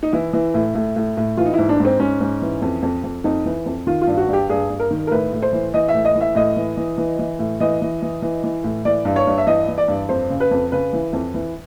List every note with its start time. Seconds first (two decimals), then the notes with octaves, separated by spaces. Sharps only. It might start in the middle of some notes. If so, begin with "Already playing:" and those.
0.03 D#4
0.13 E3 E4
0.33 E3
0.54 A2
0.75 A2
0.96 A2
1.17 A2
1.37 E3 F4
1.46 D#4
1.54 G#2 E4
1.69 D4
1.80 G#2
1.85 C4
2.00 G#2 C#4
2.21 G#2
2.42 E3
2.62 F2
2.82 F2
3.04 F2
3.24 F2 D#4
3.45 E3
3.66 F2
3.87 D#3 F4
4.02 F4
4.07 G2
4.17 F#4
4.28 G2 G4
4.49 G2 G#4
4.70 G2
4.80 A#4
4.91 D#3
5.07 A#4
5.11 A2 B4
5.33 A2
5.42 C5
5.53 E3
5.74 E3 D#5
5.88 E5
5.94 A2
6.05 D#5
6.16 E3
6.21 E5
6.35 A2 D#5
6.57 E3
6.77 E3
6.98 E3
7.19 E3
7.39 A2
7.60 E3 D#5
7.82 E3
8.02 E3
8.22 E3
8.44 E3
8.64 A2
8.85 E3 D5
9.05 G2
9.16 C#5
9.27 G2
9.38 E5
9.47 E3 D#5
9.68 E3
9.78 D5
9.88 G2
10.09 F2 C5
10.30 C#3
10.40 B4
10.51 F2
10.72 C#3 B4
10.93 E3
11.13 F2
11.34 E3